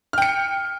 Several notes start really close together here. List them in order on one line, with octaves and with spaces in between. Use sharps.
F6 G5 C#7